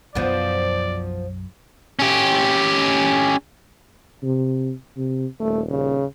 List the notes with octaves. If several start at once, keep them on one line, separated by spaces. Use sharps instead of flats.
B1 F#2 F3 B3 D5
C#4 G4
C3
C3
D#1 A3
C#3